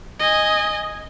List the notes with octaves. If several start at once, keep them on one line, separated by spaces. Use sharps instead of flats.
D#5 G#5